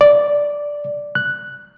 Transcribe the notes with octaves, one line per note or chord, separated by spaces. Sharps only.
D5
F#6